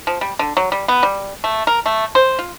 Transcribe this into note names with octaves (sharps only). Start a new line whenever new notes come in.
F3
G3
D3
F#3
G3
B3
G3
A3
A#4
A3
C5
F4